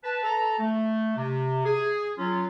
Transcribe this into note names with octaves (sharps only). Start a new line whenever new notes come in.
B4 A5
A4 A5 A#5
A3
C3
G#4
F#3 C#4 F4